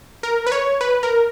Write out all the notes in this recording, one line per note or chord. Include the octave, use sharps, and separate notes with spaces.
A#4
B4
C#5
B4
A#4